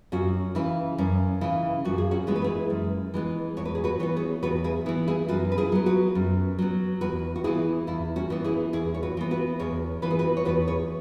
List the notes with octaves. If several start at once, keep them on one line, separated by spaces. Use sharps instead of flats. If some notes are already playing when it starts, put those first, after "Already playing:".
F#2 C#4 F#4
C#3 E3 E4
F#2 C#4
C#3 E3 E4
F#2 F#4
G#4
C#4 F#4
E3 G#3 B3 G#4
B4
E4 G#4
F#2
E3 G#3 B3
E2 C#5
B4
G#4
F#4 B4
E3 B3 C#5
G#4 C#5
E2 F#4 B4
E4 G#4
E3 B3 E4
E4 G#4
F#2 F#4 B4
B4
E4 G#4
F#3 B3
F#4 B4
F#2
F#3 B3
E2 F#4 B4
F#4
E3 B3 E4 G#4
E2 E4
C#4 F#4
E3 B3
E4 G#4
E2 E4 G#4
C#5
F#4 B4
E3 B3
F#4 B4
E2 G#4 C#5
E3 B3 B4
G#4
F#4 B4
C#5
E2 F#4 B4
G#4 C#5